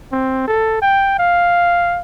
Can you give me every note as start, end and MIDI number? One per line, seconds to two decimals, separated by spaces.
0.12 0.44 60
0.47 0.80 69
0.82 1.17 79
1.18 2.02 77